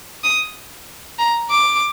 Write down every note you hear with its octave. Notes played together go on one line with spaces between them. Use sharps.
D#6
A#5
D6